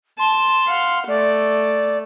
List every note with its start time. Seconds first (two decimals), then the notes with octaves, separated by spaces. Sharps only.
0.19 A5 C6
0.68 F5 F#5
1.08 A3 D5